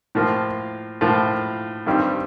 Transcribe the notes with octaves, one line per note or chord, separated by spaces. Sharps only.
A2 F3 A#3 F4
A2 F3 A#3 F4
G2 D#3 G3 C4